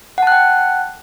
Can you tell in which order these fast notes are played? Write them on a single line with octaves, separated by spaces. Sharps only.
F#5 A5 F#6 G5